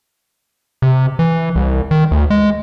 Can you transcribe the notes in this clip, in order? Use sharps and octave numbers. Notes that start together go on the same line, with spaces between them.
C3
E3
C2
D#3
D2
G#3